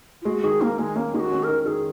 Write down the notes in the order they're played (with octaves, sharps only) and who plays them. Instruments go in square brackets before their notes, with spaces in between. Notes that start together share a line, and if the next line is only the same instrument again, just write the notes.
[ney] F4
[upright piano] G#3 [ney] F#4
[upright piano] D#3 [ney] G#4
[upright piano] D#3 [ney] A#3
[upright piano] D#3 [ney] G#3
[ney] A#3 [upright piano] C#4
[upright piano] D#3 [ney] G#4
[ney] F#4
[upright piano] C#4
[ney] A#4
[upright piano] D#3
[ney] A#4
[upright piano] D#3 [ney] G#4